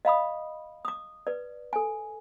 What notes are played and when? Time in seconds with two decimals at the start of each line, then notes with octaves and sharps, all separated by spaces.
0.05 D#5 F5 B5 D#6
0.85 D6 D#6
1.27 B4 D5
1.73 A4 G#5